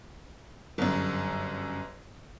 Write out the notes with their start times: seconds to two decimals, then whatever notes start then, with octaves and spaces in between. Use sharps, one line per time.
0.78 G1 F#2